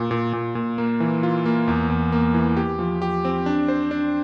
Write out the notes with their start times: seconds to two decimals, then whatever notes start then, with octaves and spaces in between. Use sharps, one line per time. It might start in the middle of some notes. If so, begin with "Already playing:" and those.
Already playing: A#2
0.11 A#2
0.33 A#2
0.55 A#2
0.78 A#3
1.00 E3
1.23 F4
1.46 A#3
1.68 E2
1.90 E2
2.12 A#3
2.34 E3
2.57 G4
2.79 F3
3.02 G4
3.25 C4
3.46 D4
3.68 C5
3.91 D4